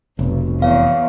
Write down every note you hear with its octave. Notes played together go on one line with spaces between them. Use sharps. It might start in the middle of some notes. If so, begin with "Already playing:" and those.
F1 B1
E2 C#5 F5